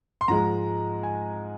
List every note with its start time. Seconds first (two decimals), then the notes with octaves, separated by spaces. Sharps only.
0.21 C6
0.28 G#2 F3 G#3 A#5
1.03 G#5